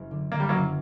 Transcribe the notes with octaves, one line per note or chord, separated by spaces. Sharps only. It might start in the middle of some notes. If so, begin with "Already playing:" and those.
Already playing: F#1
D3
D3 A#3
G3
F#3 A#3
F#1